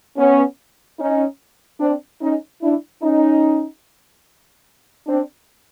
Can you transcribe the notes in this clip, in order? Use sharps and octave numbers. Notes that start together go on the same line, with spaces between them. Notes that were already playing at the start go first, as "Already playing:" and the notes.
B3 C#4
C#4 D#4
C4 D4
C#4 D#4
D4 E4
C#4 D#4
C4 D4